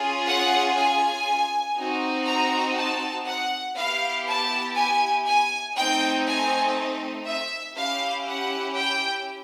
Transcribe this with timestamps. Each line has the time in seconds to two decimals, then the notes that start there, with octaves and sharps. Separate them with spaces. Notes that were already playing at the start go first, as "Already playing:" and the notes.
Already playing: C#4 F4 G#4
0.26 F#5
0.77 G#5
1.77 C4 D#4 F#4
2.26 A#5
2.76 A5
3.26 F#5
3.76 B3 E4 G4 F5
4.26 A5
4.76 G#5
5.26 G#5
5.76 A3 C4 D#4 G5
6.26 G#5
7.26 E5
7.75 C#4 E4 G4 F5
8.27 F#5
8.76 G5